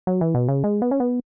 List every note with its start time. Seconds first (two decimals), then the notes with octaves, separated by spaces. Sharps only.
0.07 F#3
0.21 E3
0.34 B2
0.49 C#3
0.64 G#3
0.82 B3
0.91 C#4
1.00 B3